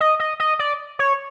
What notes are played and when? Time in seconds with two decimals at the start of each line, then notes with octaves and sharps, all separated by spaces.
0.01 D#5
0.19 D#5
0.40 D#5
0.59 D5
0.99 C#5